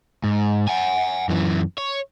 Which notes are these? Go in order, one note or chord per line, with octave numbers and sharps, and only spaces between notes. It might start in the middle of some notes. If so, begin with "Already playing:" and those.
G#2
F#5 G#5
F#2 E3
C#5